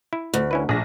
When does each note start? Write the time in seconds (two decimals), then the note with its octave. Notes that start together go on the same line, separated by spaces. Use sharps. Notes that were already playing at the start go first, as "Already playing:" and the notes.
0.13 E4
0.34 D2
0.51 C#4 E4 B4
0.69 A#1 G#4 A#6